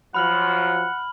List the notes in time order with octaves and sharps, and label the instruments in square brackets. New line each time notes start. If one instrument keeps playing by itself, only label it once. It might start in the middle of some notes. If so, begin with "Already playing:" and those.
[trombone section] F3 F#3 [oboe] F#5 [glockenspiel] B5 F6 F#7